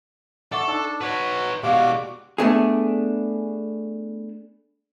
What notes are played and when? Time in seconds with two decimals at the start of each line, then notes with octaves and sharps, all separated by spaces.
0.52 A4 D5 E5 F#5 C#6
0.68 D4 D#4 E6
1.01 F#4 B4 C#5
1.63 B2 G#3 F#4 G4 D5 F5 D6
2.38 A3 B3 D4 G#4